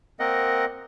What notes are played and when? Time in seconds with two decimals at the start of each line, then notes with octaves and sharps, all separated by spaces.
0.20 A#3 C4 A#4 D#5 F#5